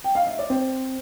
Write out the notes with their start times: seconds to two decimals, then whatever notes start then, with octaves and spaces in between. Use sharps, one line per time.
0.04 G5
0.15 F5
0.27 E5
0.39 D5
0.50 C4 C5